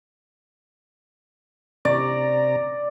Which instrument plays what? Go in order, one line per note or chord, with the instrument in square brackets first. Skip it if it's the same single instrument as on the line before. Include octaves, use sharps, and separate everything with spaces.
[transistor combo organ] C3 A#5 [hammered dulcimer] D5